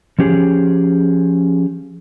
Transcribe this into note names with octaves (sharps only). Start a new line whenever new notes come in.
F3 C#4 G4 G#4